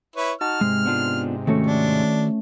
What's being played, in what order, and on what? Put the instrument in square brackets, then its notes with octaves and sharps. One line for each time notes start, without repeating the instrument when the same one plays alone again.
[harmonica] E4 B4 C#5
[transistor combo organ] D#4 F#4 A5 [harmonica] F6
[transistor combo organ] G#2 C3 [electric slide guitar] G#3
[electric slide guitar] B3 D4 F4
[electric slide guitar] D#3 F#4 A4 [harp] A3 C#4
[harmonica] D4